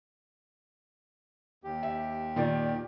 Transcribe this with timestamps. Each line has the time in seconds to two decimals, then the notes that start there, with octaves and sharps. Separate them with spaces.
1.64 D#2 G4
1.83 E5
2.36 A#2 D#3 D5